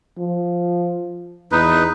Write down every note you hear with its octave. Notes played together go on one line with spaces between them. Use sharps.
F3
E2 D#4 B4